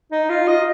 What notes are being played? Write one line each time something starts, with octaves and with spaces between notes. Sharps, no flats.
D#4
F4
D#5